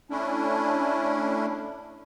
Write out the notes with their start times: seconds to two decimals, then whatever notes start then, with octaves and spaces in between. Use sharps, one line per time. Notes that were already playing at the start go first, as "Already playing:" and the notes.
0.10 A3 C#4 D4 E4